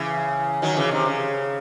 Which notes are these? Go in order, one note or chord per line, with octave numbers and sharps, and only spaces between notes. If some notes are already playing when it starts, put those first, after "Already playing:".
Already playing: C#3 E3
D#3 F#3
C#3 E3
C3 D#3
C#3